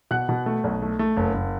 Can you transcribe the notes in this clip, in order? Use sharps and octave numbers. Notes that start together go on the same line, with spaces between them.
B2 F#5 F#6
B2
A3
B1
A3
A3
F#1
F#1